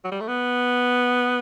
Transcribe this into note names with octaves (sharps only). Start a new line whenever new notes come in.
F#3
G3
A3
B3